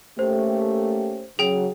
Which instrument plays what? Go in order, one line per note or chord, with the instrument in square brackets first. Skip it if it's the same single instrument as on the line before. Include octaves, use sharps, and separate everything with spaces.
[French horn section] A3 [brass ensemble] A#3 C#4 G4 [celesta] C5
[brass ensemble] C#3 F#3 [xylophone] G#4 G5